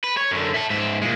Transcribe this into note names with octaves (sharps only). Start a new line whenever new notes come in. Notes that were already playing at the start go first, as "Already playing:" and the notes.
B4
C#5
F#2 D3
E4 A4
G#2 E5
A#2 G#3